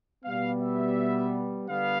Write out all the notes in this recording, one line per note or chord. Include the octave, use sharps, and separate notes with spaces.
B2 G3 B3 F5
E5
D3 G3 B3 F5